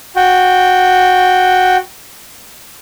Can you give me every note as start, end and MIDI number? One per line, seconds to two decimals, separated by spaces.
0.16 1.77 66
0.16 1.77 79